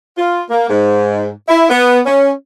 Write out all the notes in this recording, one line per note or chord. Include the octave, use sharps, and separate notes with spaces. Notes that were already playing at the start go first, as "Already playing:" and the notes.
F4
A#3
G#2
E4
B3
C#4